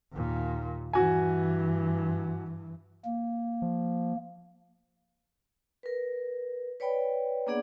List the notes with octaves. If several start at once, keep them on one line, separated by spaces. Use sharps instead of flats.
D#2 A#2
G2 E3 F#4 G#5
A#3
F3
A#4 B4
B4 C#5 D5 G5 B5
A#3 B3 D4 G#4 D5 F#5